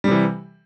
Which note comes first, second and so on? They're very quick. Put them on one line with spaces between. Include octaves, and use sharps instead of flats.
G3 C3 E3